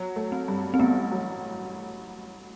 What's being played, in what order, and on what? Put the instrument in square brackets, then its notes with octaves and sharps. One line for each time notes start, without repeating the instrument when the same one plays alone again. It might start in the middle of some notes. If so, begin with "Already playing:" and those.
Already playing: [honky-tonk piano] F#3
A3
[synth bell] C4
[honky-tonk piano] G2
[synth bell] C4
[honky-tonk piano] A1 [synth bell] B3
[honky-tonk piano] F#3